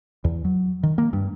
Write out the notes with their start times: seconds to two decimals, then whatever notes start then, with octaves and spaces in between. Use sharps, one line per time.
0.24 E2
0.45 F#3
0.83 D#3
0.98 A#3
1.13 G2